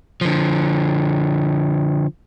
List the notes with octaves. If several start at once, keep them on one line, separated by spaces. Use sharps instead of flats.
D3 F3